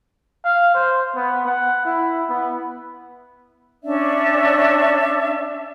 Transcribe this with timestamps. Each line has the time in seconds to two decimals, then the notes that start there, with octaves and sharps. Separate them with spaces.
0.45 F5
0.75 C5
1.16 B3
1.47 F#5
1.85 E4
2.30 B3
3.83 C#4 D4 D5 E5